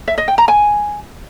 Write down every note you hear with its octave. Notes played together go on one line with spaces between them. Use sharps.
E5
D#5
G5
A#5
G#5